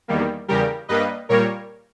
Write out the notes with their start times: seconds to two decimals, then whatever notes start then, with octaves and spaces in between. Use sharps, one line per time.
0.08 E2 D#3 G3 A#3
0.48 E2 C#3 G3 G4 A#4
0.88 G2 G3 A#3 B4 D#5
1.29 A#2 G3 A#3 A#4 C#5